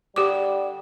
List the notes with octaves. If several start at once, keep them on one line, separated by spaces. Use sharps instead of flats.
D3 G3 G4 D6